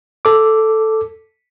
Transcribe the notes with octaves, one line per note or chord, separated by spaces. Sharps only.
A4 D6